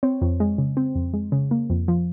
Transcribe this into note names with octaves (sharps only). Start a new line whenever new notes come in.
C4 C#5
F2
G#3
C#3
C4
F2
G#3
C#3
A#3
F2
F3